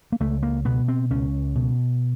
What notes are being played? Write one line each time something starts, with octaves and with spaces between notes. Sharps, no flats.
A#3
C#2 A3
A#3
B2 B3
C4
C#2 C#4
B2